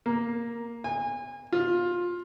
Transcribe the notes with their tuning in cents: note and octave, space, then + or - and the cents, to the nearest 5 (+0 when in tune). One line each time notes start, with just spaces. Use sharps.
A#3 +5
G#5 -30
F4 +15